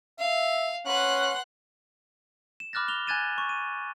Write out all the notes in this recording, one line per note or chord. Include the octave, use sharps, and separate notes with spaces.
E5 F5
C#4 B4 F#5 C6 F#6
E7
B5 D6 F6 F#6 A6 A#6
F7 G7
G#5 F#6 G#6 A6 D#7 E7
C#6
D#7